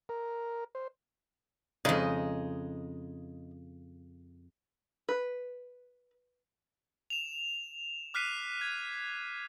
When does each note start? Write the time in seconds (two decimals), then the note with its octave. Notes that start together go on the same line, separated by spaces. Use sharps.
0.09 A#4
0.75 C5
1.85 F2 C#3 G#3 D#4
5.09 B4
7.10 E7 F7
8.14 D6 F6 F#6 B6 C7 D#7
8.61 G#6